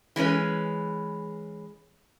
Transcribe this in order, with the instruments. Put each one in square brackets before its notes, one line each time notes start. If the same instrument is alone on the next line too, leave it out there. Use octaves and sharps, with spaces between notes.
[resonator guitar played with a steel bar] E3 G#3 C#4 B4